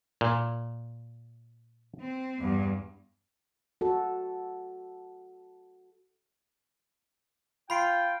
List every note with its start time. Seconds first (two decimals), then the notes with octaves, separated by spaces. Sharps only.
0.21 A#2
2.02 C4
2.40 E2 G2
3.81 F#4 A4
7.70 F4 G5 B5 C7 D7